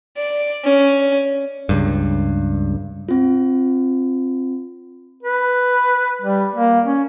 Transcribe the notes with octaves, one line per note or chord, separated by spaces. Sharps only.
D5
C#4
C#2 G2
C4 F4
B4
G3
A#3
C#4